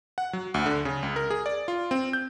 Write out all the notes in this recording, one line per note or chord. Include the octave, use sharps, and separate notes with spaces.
F#5
F#3
D2
D3
C#3
C#2
A#4
G#4
D5
F4
C4
G6